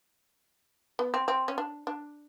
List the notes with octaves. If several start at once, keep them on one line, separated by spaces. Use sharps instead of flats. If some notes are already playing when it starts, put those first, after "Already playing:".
B3
C4
C4
C#4
D4
D4